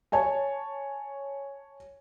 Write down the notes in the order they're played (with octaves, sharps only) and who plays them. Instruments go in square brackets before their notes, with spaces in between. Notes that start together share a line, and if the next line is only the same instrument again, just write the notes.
[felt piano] C#5 G#5 A5